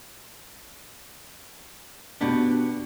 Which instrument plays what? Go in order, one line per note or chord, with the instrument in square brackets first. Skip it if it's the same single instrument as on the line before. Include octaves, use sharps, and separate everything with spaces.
[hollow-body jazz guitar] B2 B3 G4 [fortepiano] D4